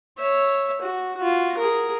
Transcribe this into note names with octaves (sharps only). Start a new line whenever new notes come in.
C#5 E5
F#4
F4 F#4
G#4 A#4